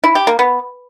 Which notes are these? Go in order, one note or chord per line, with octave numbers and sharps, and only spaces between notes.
E4
G4
A#3
B3